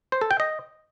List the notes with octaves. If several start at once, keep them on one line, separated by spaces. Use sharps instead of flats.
C5
A4
G5
D#5